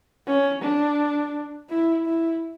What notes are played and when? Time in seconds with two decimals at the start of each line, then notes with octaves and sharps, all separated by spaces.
0.26 C#4
0.62 D4
1.69 E4
2.05 E4